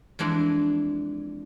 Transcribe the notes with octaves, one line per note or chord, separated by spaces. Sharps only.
F2 E3 G#3 D4